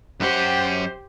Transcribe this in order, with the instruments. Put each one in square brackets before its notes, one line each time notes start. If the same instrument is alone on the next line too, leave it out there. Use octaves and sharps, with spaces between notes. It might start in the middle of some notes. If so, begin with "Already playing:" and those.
[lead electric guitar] F#2 F#5 [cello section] G4 [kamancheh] C5